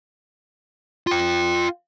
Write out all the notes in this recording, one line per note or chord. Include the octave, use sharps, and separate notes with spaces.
F4 G5